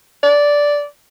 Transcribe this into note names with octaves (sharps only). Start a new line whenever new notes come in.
D5